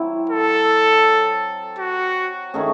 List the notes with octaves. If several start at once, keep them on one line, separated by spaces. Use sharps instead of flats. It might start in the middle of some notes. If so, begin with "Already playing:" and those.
Already playing: F#3 C4 E4
A4
F#4
D#3 A3 C#4 G#4